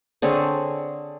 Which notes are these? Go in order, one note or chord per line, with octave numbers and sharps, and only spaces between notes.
D3 C4 G#4 C#5